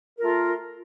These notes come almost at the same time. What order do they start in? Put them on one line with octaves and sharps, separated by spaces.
A#4 F4 A3